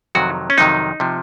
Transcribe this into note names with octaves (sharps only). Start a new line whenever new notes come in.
F2 C3 D#3 F#3 F#4
C#4
F2 C3 D#3 F#3 D#4
C3 F3